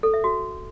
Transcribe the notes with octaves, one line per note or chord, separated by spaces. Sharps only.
A4
E5
F#4